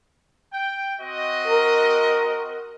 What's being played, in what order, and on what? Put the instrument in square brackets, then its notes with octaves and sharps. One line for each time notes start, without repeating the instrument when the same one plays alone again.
[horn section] G5
C4 F#4 D#5
[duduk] A#4